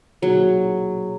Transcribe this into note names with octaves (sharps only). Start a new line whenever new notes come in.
B2 F#3 A#3 D#4 G#4